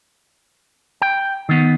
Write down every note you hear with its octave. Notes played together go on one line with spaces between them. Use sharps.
G5
D#3 B3